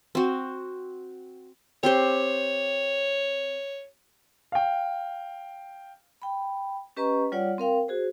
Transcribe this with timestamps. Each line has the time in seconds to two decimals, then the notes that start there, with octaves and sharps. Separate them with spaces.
0.15 C4 F#4
1.83 C4 G4 C5 C#5
4.52 F5 G5
6.22 G5 B5
6.97 C#4 G4 B4 D#5 A#5 C#6
7.32 G3 F4 C#5 D5 F#5
7.58 C4 A#4 F5 G5
7.88 F#4 G#4 C5